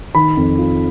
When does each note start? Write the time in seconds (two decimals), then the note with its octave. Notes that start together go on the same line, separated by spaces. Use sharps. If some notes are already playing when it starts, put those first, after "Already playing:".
0.15 D#3 B5
0.37 F2
0.58 F4